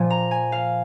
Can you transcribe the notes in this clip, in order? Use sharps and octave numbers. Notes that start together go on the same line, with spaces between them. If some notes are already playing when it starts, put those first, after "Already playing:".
Already playing: A#2 F3 G#5
A#5
G#5
F5